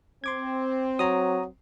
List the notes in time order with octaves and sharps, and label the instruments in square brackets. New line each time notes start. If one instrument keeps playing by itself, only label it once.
[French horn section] C4 [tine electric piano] C6 D6 G#6
[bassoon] F#3 [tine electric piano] C#5 A#5 D#6